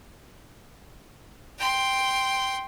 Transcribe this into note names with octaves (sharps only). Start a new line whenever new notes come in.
G5 C6